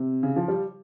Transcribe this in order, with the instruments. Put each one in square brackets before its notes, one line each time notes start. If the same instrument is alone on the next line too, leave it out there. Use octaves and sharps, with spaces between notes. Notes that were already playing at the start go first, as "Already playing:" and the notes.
Already playing: [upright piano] C3
C#3
F3
G3